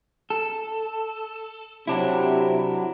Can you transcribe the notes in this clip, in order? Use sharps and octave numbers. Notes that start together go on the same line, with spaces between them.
A4
C3 F#3 D4 E4